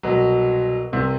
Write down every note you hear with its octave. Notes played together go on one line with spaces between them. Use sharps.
C2 B2 F#3
C2 C3 E3